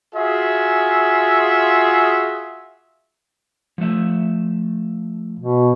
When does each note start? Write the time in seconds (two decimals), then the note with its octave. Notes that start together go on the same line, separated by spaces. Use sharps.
0.14 F4 F#4 G#4 E5
3.78 F3 A3 E5
5.39 B2